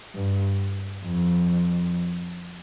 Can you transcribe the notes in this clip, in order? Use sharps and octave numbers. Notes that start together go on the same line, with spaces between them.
G2
F2